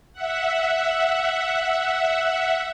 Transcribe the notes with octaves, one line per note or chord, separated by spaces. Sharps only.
E5 F#5